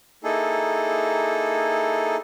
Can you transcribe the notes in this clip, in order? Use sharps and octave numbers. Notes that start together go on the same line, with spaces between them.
A#3 D#4 E4 G#4 A4